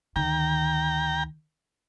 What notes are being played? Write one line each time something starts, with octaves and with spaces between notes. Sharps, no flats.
D2 D#3 G5 A#5